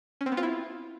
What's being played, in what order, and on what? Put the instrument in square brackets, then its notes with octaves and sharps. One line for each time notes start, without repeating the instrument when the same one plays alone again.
[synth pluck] C#4
C4
B3
F4
E4